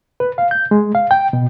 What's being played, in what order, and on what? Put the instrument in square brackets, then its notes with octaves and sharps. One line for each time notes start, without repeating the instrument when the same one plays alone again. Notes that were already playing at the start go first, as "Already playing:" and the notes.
[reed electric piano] B4
F5
G6
G#3
F5
G5
B2